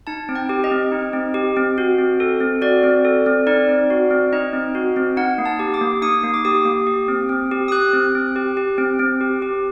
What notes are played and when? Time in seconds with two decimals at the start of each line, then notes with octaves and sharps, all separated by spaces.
0.07 D#4 A5
0.29 C4
0.35 G5
0.49 G4
0.64 D#5
0.71 C4
0.92 D#4
1.13 C4
1.34 G4
1.57 C4
1.78 F#4
1.98 C4
2.20 A4
2.40 C4
2.62 F#4 D5
2.83 C4
3.05 A4
3.26 C4
3.47 D#4 D5
3.69 C4
3.90 F#4
4.11 C4
4.33 D#4 D#5
4.53 C4
4.75 F#4
4.96 C4
5.17 D#4 F#5
5.38 A#3
5.46 A5
5.59 G4
5.74 D6
5.81 A#3
6.02 D#4 D#6
6.24 A#3
6.34 D6
6.45 G4 D#6
6.65 A#3
6.87 G4
7.08 C4
7.29 C4
7.51 G4
7.68 D#6
7.72 G4 F#6
7.93 C4
8.15 C4
8.36 G4
8.57 G4
8.78 C4
8.99 C4
9.21 G4
9.42 G4